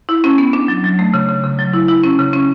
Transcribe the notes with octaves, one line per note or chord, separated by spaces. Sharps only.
E4
C#4
B3
D4
F#3
F#3
A3
C#3
C#3
C#3
F#3
E4
E4
C#4
C#3
C#4